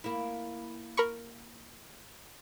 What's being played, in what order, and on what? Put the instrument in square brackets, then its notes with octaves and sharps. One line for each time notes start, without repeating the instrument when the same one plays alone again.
[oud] A#3 E4
[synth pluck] A#4 B5 C#6